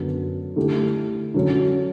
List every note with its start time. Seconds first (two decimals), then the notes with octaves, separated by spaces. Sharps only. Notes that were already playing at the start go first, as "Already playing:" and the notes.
Already playing: F#2 D3 F#3 B3 F#4
0.56 D3 A3 E4 G4
1.34 D3 F#3 C#4 F#4